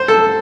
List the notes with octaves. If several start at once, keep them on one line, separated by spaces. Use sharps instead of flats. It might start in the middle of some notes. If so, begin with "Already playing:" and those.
Already playing: C5
A4